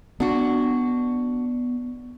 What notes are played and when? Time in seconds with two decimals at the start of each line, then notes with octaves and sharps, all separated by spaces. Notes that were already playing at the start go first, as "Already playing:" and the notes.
0.20 B3 D4 F#4